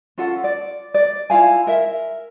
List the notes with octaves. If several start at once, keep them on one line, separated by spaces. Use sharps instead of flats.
C#4 F4 A4 F#5
D5
D5
E4 F4 F5 G#5
A#4 E5